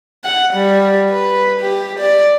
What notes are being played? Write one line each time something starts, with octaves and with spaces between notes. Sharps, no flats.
F#5
G3
B4
G4
D5